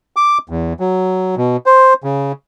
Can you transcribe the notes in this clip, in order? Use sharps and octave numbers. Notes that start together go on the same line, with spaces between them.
D6
E2
F#3
B2
C5
C#3